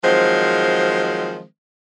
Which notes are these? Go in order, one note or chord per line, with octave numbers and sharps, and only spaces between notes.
D#3 F3 F#3 G#3 C4 C5